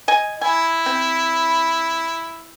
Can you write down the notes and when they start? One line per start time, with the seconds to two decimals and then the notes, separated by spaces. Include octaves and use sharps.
0.08 D#5 G#5
0.41 E4 G#5
0.86 C4